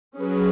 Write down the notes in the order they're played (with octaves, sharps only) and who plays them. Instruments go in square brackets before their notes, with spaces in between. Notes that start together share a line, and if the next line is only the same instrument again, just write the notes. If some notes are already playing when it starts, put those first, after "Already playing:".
[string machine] F#3 [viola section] C#4 G#4 B4